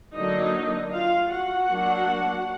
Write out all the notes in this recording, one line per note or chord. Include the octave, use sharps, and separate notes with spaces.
D3 F#3 A#3 D4 D#4 D#5
F4 F5
F#4 F#5
F#3 A#3 D4